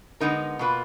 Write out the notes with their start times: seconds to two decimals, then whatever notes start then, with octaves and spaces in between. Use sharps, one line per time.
0.20 D3 G#3 B3 D#4 A#4
0.59 B2 A#3 F4 B4